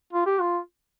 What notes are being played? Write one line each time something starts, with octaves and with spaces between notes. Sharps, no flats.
F4
G4
F4